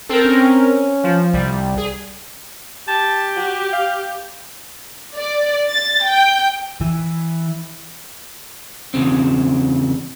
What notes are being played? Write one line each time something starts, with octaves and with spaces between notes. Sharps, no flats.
C4 A4 A#4
C#4
F3
C2 G3
G#4
G4 A5
F#4
F5
D5
A6
G5
E3
E2 A#2 C#3 C4